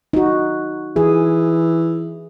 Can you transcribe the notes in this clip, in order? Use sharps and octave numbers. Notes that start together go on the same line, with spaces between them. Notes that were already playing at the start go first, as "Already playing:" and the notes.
D#4 F#4
E3 G#4